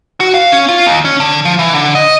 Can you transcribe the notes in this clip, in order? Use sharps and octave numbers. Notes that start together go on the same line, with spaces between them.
F#4
F5
C#4
F4
D#2
C#4
D3
F3
E3
D3
D#5